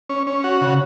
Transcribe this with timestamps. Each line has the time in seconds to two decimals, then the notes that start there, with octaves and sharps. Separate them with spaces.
0.09 C#4
0.27 C#4
0.44 F#4
0.61 C#3